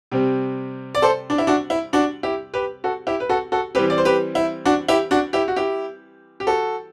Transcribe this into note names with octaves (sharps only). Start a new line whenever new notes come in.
C3 G3 C4
D5
A4 C5
D4
E4
D4 F#4
E4
D4 F#4
E4 G4
G4 B4
F#4 A4
E4 G4
B4
F#4 A4
F#4 A4
E3 G3 C4 G4 B4
D5
C5
G4 B4
E4
D4 F#4
E4 G4
D4 F#4
E4 G4
F#4
E4 G4
G4
F#4 A4